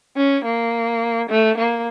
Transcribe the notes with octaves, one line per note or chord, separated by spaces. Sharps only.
C#4
A#3
A3
A#3